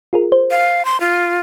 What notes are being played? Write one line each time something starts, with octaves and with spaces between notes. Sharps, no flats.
F4 G#4 A#4
C5
F5
C6
F4